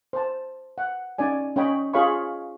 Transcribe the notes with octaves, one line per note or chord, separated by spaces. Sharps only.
C5 A5
F#5
C#4 D#4 D5 G#5
C#4 C#5 D#5 G5 B5
F4 G#4 C#5 F5 B5 C#6